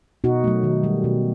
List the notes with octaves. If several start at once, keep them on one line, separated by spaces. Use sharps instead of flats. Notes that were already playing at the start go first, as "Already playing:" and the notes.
B2 D#4 F#4
F#3 A3
D#3
G3
B2